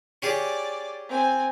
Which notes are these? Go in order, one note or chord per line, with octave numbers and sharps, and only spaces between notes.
C#4 G4 G#4 D5
C4 G#5